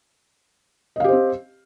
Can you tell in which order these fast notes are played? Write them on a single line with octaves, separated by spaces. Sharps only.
D#5 F5 G4 C5 C4